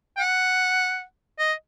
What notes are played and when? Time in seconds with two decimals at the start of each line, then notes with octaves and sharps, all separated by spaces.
0.17 G5
0.20 F#5
1.39 D#5